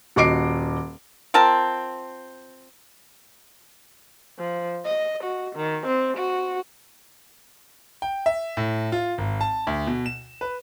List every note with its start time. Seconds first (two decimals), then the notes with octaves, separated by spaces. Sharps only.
0.16 D#1 F#4 D#5 D6 C7 D7
1.34 C4 F4 A#4 A5
4.39 F3
4.85 D#5
5.24 F#4
5.56 D#3
5.87 C4
6.17 F#4
8.02 G5
8.26 E5
8.57 A2
8.92 F4
9.18 G#1
9.41 A5
9.67 D2
9.87 B2
10.06 E7
10.41 B4